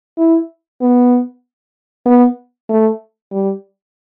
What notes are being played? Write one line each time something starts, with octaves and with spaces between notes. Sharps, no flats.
E4
B3
B3
A3
G3